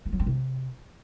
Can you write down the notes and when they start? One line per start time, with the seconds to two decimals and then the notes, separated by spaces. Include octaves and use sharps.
0.06 A#3
0.13 F#3
0.19 C4
0.26 C3